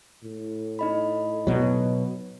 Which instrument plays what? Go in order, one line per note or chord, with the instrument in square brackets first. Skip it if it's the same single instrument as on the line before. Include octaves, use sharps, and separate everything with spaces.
[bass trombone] A2
[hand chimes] D#4 D#5 B5
[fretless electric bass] B2 F#3